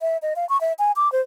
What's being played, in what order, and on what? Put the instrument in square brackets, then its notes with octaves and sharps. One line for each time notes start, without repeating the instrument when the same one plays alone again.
[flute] E5
D#5
F5
C#6
E5
G#5
D6
C5